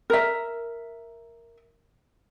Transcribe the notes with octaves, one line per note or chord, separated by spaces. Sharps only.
A#4 E5